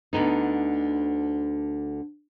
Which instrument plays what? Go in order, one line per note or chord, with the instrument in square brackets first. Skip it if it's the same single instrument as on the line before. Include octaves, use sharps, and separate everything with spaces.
[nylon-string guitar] D2 D3 B3 D#4